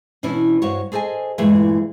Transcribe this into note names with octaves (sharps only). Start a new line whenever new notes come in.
B2 E3 C#4 D4 E4
G2 F#4 C5 C#5
G#4 A4 C5 D#5 G#5
G2 A#2 E3 G#3 A3